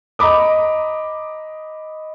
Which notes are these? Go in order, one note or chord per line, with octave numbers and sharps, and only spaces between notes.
D#5 A#5 B5 D6 D#6